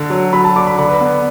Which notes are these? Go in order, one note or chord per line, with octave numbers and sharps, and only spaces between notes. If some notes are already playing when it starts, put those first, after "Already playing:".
Already playing: D3 D4
F#3
F#3 B5
A5
D3 D6
B5
D3 B5
B4
B3